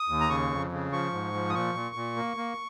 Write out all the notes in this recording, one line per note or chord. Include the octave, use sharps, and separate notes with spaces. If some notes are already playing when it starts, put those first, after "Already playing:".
Already playing: D#6
D#2
A#5
C#3 C#6
F2
C#3
F3 C#6
G#2
F3
D#6
A#2 C#6
A#2
A#2
A#3
A#3